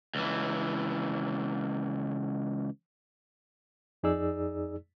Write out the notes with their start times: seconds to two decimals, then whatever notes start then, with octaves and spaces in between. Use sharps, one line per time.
0.15 C#2 E3
4.03 F2 D#4 G#4 D5 E6